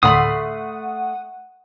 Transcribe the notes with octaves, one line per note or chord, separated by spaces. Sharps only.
D2 A2 D3 A3 F#5 B5 C6 D#6